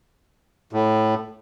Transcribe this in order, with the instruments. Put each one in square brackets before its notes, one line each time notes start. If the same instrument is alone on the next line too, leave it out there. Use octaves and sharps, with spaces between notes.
[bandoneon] A2